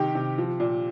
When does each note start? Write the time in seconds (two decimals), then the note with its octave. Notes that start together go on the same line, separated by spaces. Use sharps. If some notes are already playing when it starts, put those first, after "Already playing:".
Already playing: C3 D#3 G4
0.15 C3
0.38 F3
0.60 A#2